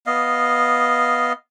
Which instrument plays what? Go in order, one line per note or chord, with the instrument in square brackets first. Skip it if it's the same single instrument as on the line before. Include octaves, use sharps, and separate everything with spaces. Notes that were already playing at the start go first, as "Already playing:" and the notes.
[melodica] B3 D#5 F5